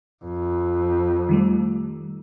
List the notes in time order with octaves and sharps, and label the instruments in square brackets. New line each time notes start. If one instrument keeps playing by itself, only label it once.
[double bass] F2
[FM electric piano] D#3 G3 A3